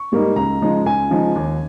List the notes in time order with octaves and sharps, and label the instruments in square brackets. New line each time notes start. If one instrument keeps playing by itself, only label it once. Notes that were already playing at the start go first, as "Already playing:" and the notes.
Already playing: [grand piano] C#6
G#2 G3 A#3 D#4
C#2 A#5
C#3 F3 G#3 D#4
C#2 G#5
C#3 F3 G#3 D#4
D#2